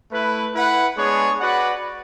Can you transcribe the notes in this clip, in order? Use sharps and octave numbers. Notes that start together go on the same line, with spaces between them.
A3 E4 B4
E4 B4 F#5
G#3 B3 D4 G#4 C#5
F#4 B4 D5 F#5